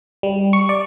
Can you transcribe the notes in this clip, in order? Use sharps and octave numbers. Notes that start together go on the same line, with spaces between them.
G3
C#6
D5